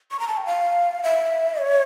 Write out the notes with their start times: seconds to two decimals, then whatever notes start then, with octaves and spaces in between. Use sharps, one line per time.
0.11 C#6
0.19 A#5
0.28 A5
0.37 G5
0.46 F5
1.04 E5
1.61 C#5